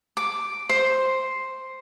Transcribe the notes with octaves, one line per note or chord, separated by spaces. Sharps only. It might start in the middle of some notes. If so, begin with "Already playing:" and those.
D6
C5